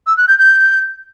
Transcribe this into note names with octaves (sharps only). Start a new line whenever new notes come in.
E6
F#6
G6
G6